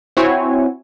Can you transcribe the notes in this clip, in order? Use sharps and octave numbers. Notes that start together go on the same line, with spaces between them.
C4 E4 F#4 C#5 G#5